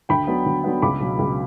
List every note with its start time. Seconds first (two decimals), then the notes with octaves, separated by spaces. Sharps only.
0.09 D2 G5 B5
0.27 D3 F#3 B3
0.46 D2
0.64 D3 F#3 B3
0.82 C#2 B5 D6
1.00 B2 F#3
1.19 C#2